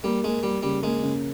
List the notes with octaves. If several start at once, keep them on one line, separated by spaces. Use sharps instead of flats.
G3 A#3
G#3 A#3
G3 A#3
C#3 G3
G#3 A#3
C#3